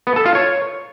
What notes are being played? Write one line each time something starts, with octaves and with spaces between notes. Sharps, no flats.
B3
A4
F4
C#5